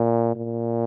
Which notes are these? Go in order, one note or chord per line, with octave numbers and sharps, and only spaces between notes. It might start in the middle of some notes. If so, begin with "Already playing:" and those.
Already playing: A#2
A#2